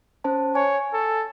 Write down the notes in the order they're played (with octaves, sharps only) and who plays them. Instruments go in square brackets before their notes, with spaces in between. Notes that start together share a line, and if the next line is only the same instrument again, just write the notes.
[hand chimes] C#4 C5 A5
[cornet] C#5 [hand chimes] G#5
[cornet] A4